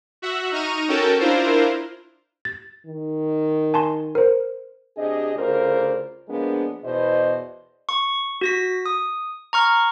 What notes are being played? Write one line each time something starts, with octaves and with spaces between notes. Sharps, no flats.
F#4 E5 F#5
D#4 A#5 C#6 F6 D#7
C#4 F#4 A4 A#4 G5 A5
D4 E4 F4 A#4 C5
A6
D#3
G#5 A5 C6
A#4 C5
C3 D4 G#4 D#5
D2 C#3 F4 A#4 C5 D5
F3 G#3 A#3 B3 D4
E2 B2 E4 C5 D5 D#5
C#6
F#4 A#6 B6
D#6
A#5 C#6 F6